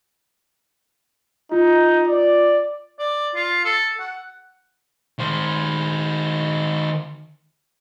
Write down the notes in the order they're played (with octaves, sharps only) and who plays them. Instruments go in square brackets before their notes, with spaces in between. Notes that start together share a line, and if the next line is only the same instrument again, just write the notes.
[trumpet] D#4 [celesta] F4
[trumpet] D5
[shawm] D5
F4
A4
F#5
[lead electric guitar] D#3 C5